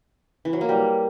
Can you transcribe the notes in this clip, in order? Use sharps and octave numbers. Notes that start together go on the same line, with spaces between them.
E3
F#3
A#3
G3